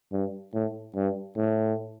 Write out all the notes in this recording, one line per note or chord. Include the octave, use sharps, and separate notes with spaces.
G2
A2
G2
A2